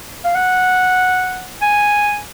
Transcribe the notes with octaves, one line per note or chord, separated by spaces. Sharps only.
F5
F#5
G#5